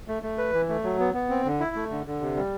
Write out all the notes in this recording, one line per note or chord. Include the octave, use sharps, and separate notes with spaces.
A3
A3
B4
E3
A3
F#3
B3
B3
C4
D3
E4
A3
D3
D3
C3
G3